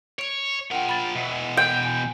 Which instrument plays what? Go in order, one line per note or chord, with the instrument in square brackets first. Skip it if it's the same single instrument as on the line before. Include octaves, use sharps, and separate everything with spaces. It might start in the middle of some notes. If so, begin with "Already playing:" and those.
[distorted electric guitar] C#5 [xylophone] D7 F7
[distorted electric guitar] F3 A#4 [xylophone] F#5 G5
[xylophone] B5 A6
[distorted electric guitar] B2 E3
[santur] G5
[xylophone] G#5 D7